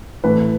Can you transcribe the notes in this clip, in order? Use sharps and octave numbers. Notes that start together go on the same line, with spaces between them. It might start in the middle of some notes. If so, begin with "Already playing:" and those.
A2 E3 A3 B4